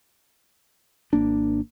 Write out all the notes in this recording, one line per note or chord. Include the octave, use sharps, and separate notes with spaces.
G#1 A#3 D4